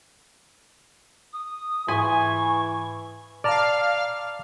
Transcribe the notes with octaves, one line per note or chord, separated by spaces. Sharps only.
D#6
G#2 E3 G#5 C#6
D5 F5 A5 A#5 F6